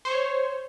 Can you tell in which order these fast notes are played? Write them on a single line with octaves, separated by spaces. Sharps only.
C5 C#6 C#5